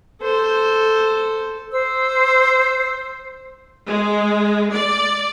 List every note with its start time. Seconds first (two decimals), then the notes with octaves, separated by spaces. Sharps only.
0.22 A4 C5
1.71 C5 E6
3.87 G#3
4.73 D5